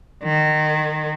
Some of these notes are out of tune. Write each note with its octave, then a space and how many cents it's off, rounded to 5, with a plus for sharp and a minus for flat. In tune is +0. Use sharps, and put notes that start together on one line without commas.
D#3 -25